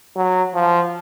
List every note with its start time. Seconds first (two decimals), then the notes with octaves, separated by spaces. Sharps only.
0.16 F#3
0.54 F3